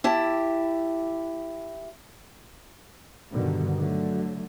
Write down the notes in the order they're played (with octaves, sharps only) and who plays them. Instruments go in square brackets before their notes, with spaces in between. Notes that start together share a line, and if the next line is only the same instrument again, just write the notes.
[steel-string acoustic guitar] E4 G4 A5
[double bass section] G2 B2 D3 D#3
D3 F#3 A3